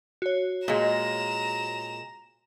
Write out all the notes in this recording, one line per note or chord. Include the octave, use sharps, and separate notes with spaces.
F#4 C#5
A#2 G#3 A#5 E7